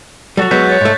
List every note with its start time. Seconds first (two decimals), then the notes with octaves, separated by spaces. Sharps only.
0.37 F#3 G3 F#4 A4
0.51 F#3 G#3 B3 F#6 G6 B6
0.69 C#5 A6
0.81 G#2 A3